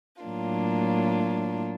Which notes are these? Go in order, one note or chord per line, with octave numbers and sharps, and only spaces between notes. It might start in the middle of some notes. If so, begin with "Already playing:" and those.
A2 F#3 A#3 D4 F4